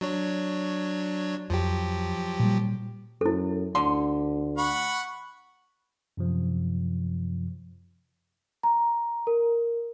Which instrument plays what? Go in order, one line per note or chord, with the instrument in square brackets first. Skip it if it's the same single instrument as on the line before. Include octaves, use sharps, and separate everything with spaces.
[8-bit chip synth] F#3 D4 C#5
[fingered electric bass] F2 [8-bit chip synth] F3 F#3 G4
[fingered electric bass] A#2 G3
[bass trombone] F#2 [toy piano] E4 A4
[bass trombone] D2 [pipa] D3 C6
[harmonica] F#5 B5 C#6
[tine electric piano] F#2 C3 F3
[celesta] A#5
A#4